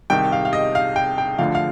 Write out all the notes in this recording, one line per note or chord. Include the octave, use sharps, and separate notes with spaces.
C2 C3 D#3 G5
F5
F5
D#5
F5
G5
G5
D2 D3 F3 F5
F5